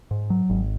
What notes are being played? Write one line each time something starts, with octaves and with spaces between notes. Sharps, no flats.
G#2
F#3
G#1